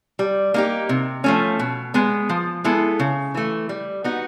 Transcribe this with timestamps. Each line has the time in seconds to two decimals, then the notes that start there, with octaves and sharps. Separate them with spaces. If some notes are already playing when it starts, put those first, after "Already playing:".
0.19 G3
0.54 A#3 D#4 G4
0.89 C3
1.24 F3 A3 C#4
1.59 B2
1.94 G#3 B3
2.29 F3
2.64 G#3 B3 E4 A4
2.99 C#3
3.34 E3 A3
3.69 G3
4.04 B3 D#4 F#4